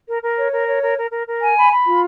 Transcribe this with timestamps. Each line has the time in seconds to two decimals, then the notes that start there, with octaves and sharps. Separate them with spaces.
0.08 A#4
0.23 A#4
0.38 C#5
0.52 A#4
0.67 C#5
0.82 A#4
0.97 A#4
1.12 A#4
1.27 A#4
1.41 G#5
1.57 B5
1.71 B5
1.86 F4